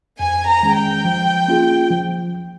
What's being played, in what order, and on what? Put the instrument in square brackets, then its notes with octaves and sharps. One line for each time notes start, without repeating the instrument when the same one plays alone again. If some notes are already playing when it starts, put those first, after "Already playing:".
[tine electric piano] F2 [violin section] G#5
[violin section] A#5
[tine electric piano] D#3 G#3 C#4 G#4
[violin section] G5
[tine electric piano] F3
A#3 C#4 F4 G#4
F3